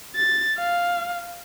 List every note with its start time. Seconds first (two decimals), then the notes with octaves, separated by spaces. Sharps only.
0.16 A6
0.58 F5